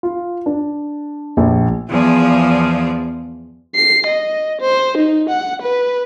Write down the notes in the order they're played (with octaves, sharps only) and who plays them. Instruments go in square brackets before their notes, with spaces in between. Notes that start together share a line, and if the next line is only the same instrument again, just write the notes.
[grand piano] F4
D4
A#1
[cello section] E2 F3 G#4 D5
[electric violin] C7
D#5
C5
D#4
F#5
B4